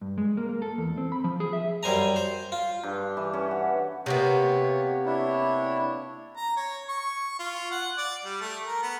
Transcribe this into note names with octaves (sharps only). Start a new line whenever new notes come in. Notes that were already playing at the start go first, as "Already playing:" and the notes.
G2
G#3
A#3
A#3
A4
E2
C4
B5
F3
G#4
E5
F#2 G3 C5 G#5 A#5
C5
F4
G2
E3
C#4
F#4
C3 A#3 B3 C#5
D4 E4 C#5
A#5
C#5
C#6
F4
F#5
D5
G3
A3
A#4
B3